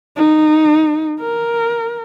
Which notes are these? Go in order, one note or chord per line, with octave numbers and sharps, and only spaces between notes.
D#4
A#4